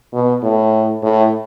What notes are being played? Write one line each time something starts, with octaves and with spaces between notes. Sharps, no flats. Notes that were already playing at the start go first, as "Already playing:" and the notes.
B2
A2
A2